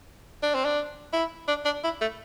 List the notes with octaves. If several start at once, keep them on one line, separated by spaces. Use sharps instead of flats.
D4
C4
D4
E4
D4
D4
E4
A3